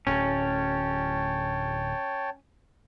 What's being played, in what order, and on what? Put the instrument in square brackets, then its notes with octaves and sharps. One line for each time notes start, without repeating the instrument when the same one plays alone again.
[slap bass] D1 A2 [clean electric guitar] C#4 [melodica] C#5 G5 A5